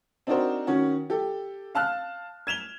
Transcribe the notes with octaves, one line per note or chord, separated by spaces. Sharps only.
C4 D4 D#4 F#4 A#4 C5
D#3 C#4 F#4
G4 A4
F5 A5 F6 F#6
G#6 E7 F7 G7